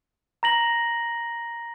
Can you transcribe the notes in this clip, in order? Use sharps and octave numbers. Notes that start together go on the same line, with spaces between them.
A#5 A#6 F#7